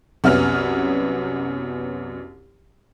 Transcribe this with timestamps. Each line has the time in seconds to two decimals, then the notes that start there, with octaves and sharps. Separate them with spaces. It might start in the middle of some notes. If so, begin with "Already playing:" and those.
0.24 C2 F#2 B3 C#4 F6